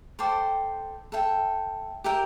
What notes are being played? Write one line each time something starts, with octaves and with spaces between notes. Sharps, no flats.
A4 C5 G5 D6
A4 E5 G5
G4 A#4 E5 G5